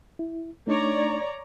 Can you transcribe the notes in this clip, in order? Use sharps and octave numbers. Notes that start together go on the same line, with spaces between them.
E4
A3 D4 D#4 C#5 D5 A#5